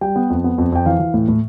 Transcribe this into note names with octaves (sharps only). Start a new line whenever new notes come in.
G3 G5
B3
F2
B3
F2
F2 G5
E3 F5
E3
A2
A2